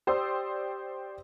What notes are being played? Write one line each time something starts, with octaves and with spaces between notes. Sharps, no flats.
G4 C5 D5 C6 D#6 E6